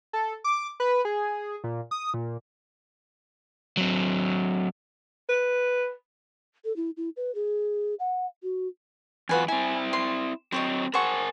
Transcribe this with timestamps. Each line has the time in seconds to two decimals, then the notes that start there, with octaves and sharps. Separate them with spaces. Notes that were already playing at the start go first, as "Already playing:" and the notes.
0.13 A4
0.44 D6
0.80 B4
1.05 G#4
1.64 A#2
1.91 D#6
2.14 A#2
3.77 F#3 C4
5.29 B4
6.65 A4
6.76 E4
6.97 E4
7.17 B4
7.35 G#4
8.00 F#5
8.43 F#4
9.29 E2 F4 F#4 B4 G#5
9.48 C4 E4 G#5
9.93 C6
10.52 F#3 C4 C5 C#5 D#5
10.94 A#4 C5 F#5 G#5 A5 C#6